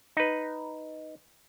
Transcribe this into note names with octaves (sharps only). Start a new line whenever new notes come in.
D#4 B4